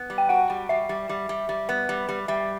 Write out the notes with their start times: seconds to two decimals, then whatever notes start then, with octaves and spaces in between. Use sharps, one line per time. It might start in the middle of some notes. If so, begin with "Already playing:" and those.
Already playing: B3
0.10 G3
0.18 G5
0.29 F#4 F#5
0.50 G3
0.69 G3 E5
0.89 G3
1.09 G3
1.29 G3
1.49 G3
1.69 B3
1.89 G3
2.09 G3
2.28 G3 E5